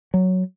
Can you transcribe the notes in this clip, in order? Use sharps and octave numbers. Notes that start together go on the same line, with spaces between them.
F#3